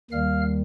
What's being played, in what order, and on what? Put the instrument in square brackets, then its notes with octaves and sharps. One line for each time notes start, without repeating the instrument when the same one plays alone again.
[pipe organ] D#2 D#3 G3 F5 F6